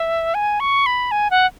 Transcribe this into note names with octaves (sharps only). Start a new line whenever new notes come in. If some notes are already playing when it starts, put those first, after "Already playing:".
Already playing: E5
G#5
C#6
B5
G#5
F#5